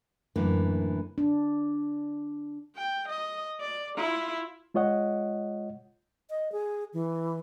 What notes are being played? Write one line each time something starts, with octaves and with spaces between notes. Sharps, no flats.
F#2 A2 D3 E3 A#3
D4
G5
D#5
D5
E4 F4
G#3 F4 C#5 D#5 F#5
D#5
G#4
E3